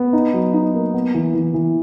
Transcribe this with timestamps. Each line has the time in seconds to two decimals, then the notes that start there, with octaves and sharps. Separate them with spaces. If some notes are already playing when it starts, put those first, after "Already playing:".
Already playing: B3
0.13 D#4
0.34 F#3
0.54 D#4
0.74 A#3
0.94 B3
1.14 E3
1.34 E3
1.54 E3